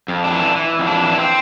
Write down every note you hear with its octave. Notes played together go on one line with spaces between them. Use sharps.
F2
D4
E3
E3
F2
D4
E3
C4